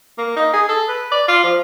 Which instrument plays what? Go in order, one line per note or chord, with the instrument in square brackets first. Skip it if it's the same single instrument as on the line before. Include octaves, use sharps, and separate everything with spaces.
[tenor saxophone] A#3
D#4
G#4
A4
B4
D5
F4
F3